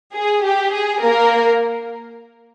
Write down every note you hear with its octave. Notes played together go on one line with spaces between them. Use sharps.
G#4
G4
G#4
A#3 A#4